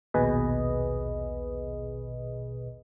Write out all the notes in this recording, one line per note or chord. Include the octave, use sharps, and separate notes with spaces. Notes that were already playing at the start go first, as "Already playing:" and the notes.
A#1 D#2 B2 G#4 B4 D#5